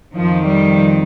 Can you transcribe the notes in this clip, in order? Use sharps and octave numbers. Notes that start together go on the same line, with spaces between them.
F2 D#3 F3
G3